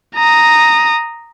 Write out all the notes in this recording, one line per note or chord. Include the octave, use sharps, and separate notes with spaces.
A#5 D#6